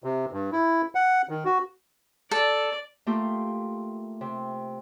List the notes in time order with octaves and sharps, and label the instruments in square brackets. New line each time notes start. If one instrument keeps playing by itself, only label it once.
[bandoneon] C3
G2
E4
F#5
D#3
F#4
[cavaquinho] A4 [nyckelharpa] D5
[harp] A3 A#3 F4 G4
C3